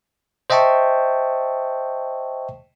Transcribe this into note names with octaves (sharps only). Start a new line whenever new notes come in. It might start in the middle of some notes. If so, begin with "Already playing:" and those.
C5 D#5 E5 G5 A5 C#6